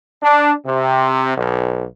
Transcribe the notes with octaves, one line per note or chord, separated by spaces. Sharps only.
D4
C3
B1